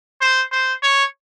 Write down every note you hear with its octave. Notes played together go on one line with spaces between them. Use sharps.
C5
C5
C#5